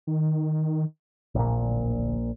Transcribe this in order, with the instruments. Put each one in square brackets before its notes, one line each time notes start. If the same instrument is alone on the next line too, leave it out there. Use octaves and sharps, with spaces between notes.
[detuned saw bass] D#3
[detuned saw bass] D1 [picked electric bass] A#1 A#2